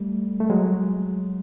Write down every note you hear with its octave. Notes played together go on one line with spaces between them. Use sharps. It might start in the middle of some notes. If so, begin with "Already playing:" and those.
Already playing: G3 A3
A3
F#3 G#3